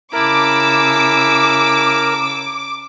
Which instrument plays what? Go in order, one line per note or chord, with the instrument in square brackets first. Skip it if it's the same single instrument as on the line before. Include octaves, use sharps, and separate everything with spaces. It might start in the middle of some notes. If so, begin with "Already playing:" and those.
[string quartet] C#3 E6 [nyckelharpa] E4 A5 [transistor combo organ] A#4 [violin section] D6